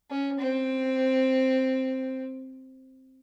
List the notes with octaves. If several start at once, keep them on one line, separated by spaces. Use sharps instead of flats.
C#4
C4